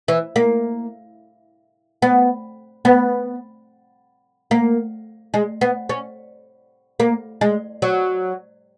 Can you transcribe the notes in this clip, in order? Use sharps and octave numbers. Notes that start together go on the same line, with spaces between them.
E3
A#3
B3
B3
A#3
G#3
B3
C#4
A#3
G#3
F#3